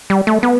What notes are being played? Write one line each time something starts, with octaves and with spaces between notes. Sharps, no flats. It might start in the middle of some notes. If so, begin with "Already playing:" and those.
G3
A3
B3